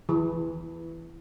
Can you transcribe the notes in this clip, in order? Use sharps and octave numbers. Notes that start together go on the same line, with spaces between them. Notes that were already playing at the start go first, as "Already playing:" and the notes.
E3